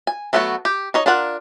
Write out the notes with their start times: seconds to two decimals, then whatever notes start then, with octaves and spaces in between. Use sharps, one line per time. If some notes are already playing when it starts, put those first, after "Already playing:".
0.07 G#5
0.33 F#3 A3 B3 E4 F#4
0.65 G4
0.94 D#4 C#5 D#5
1.06 D4 F4 A#4 F#5